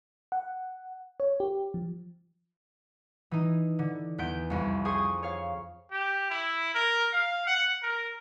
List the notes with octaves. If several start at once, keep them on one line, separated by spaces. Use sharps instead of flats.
F#5
C#5
G4
F3
E3 D#4
D3
E2 B3 G6 D7
C2 F2
G#4 C5 G#5 C#6 D#6
C#5 F5
G4
E4
A#4
F5
F#5
A#4